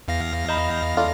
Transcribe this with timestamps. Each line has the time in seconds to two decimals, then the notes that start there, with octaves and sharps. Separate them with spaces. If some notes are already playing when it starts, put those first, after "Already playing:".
0.08 E2 F5 A#6
0.49 D#5 A#5 B5 G6
0.97 A3 D4 F4